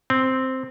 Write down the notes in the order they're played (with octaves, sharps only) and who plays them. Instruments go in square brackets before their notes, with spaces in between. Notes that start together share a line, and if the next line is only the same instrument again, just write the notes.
[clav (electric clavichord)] C4